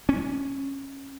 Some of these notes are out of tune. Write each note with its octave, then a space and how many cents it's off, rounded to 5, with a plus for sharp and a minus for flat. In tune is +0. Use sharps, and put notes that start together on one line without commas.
C#4 -15